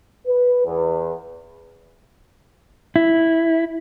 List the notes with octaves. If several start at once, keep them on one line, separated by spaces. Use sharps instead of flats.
B4
E2
E4